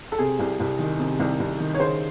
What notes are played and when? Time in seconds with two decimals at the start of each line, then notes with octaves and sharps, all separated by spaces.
0.12 A4
0.18 C3 G#4
0.39 C2
0.60 C2
0.79 D#3
0.99 C3
1.19 C2
1.40 C2
1.59 D#3
1.74 C#5
1.79 C#3 C5